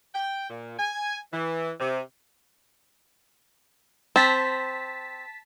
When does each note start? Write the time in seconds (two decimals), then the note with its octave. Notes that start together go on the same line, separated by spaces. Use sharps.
0.15 G5
0.50 A#2
0.79 G#5
1.33 E3
1.80 C3
4.16 C4 A5 B6